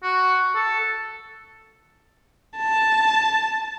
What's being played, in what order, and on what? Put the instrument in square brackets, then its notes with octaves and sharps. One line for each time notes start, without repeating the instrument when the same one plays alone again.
[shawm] F#4
A4
[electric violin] A5